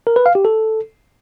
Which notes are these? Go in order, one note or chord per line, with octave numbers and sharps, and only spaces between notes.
A#4
B4
F5
G4
A4